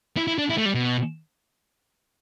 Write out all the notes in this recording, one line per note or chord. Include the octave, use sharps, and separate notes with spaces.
E4
E4
D4
E4
A3
G3
B2